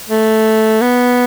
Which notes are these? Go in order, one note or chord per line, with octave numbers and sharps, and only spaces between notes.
A3
B3